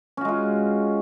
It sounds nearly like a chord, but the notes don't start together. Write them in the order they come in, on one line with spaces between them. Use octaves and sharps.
C#4 F#4 G#3 F4